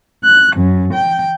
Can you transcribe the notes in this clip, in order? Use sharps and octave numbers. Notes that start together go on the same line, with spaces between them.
F#6
F#2
G5